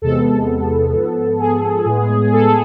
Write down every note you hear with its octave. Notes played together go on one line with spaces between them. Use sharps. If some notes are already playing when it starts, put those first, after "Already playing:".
E2 C3 G#3 B3 A4
G#2 F3 B3
G#4
A2 G#3 B3
A4
A4